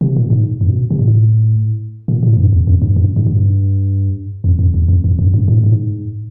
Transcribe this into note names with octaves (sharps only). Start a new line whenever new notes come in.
C3
A#2
G#2
F#2
B2
C3
G#2
A2
A#2
A2
F#2
E2
F2
G2
F#2
G#2
G2
F2
F2
E2
F2
F2
F#2
G2
A2
G#2